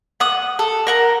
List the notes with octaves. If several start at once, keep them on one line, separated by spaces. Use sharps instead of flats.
F#5 D#6
A4
A#4 F#5 A#5